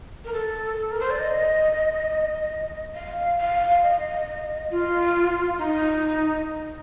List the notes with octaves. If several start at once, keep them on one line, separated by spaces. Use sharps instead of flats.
A#4
A4
A#4
C5
D5
D#5
F5
F5
D#5
F4
D#4